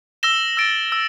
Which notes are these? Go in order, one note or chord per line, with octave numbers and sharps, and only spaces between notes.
E6 A#6 E7 G7
E6 A6 D7
E6